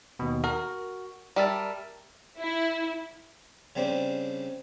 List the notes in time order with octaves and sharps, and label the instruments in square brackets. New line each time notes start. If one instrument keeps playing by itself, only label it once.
[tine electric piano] D#2 B2
[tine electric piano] F#4 [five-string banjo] A#4
[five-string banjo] G3 [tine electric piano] A#4 E5 A5
[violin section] E4
[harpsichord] C#3 G3 C4 D4 C5